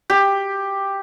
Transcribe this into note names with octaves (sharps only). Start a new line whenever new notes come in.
G4